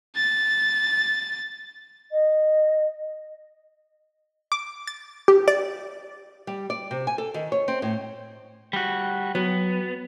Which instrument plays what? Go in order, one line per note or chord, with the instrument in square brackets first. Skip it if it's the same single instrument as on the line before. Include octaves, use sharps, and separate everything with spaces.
[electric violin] A6
[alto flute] D#5
[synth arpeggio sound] D6
A6
G4
D5
[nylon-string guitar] G3
D5
C3
G#5
A4
D#3
C#5
C4
A2
[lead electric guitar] G3 F#4
[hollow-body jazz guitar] F#3 [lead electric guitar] B3